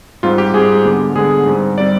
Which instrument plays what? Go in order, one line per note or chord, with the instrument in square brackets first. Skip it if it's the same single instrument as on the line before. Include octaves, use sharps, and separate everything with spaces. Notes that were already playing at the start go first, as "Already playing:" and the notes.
[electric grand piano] G#2 G3 C4 F4
G4
G#2 G3 C4 G#4
D3 G#3 B3
D3 G#3 B3 G#4
G#2 G3 C4
G3 C4 D5